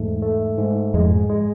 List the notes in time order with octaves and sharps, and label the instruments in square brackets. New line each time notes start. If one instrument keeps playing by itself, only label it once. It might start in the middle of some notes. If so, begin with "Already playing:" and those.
Already playing: [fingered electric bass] E2 [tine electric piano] G#2 A3
[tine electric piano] A3
G#2
[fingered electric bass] F2 [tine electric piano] G#3
[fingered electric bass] G#2
[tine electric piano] G#3